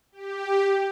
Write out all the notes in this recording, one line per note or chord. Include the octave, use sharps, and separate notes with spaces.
G4